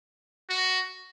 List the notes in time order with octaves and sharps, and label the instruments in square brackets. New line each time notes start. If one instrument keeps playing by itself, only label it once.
[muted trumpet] F#4